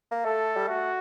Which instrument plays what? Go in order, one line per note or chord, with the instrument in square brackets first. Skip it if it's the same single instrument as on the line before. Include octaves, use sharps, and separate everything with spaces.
[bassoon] A#3
[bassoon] A3 [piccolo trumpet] A4
[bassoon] G3
[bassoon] A3 [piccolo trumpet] F#4